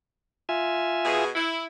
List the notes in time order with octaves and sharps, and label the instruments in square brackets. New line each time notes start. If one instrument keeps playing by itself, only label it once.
[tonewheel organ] F4 E5 G#5
[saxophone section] B2 G#4
E4